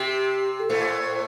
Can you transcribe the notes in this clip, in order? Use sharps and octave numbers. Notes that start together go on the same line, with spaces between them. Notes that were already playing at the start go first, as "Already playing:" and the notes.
Already playing: C3 C4 G4
A4
A2 A3 C5